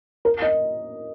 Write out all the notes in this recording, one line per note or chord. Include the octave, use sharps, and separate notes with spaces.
A#4
D#5